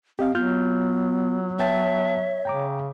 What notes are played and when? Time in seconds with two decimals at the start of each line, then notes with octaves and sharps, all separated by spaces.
0.19 C4 G4 D#5 F5
0.35 F#3 B3 F4 F6 G6
1.59 B3 C#5 E5 G5 A5
2.45 C#3 G5 A#5 D6